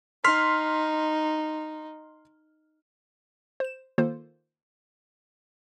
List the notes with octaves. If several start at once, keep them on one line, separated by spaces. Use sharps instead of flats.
D#4 C6 F6 B6
C5 E7
D#3 A#3 F4 A4 C5